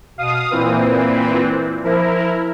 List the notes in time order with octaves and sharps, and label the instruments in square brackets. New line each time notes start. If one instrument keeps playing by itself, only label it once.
[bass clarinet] B2 [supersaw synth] F5 D#6
[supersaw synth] A#2 E3 C4 [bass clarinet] B4
[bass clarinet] F3 [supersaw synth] E4 A#4